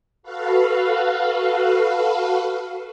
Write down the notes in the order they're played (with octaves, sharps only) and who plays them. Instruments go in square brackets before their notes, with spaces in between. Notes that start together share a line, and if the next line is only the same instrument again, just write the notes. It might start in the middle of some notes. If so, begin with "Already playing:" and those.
[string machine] F#4 A4 B4 F5